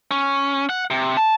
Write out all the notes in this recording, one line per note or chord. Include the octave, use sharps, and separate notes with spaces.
C#4
F#5
C3
A5